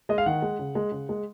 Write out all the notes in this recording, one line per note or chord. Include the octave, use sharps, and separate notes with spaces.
G#3 D#5
F5
D#3 F#5
G#3
C#3
G#3
C#3
G#3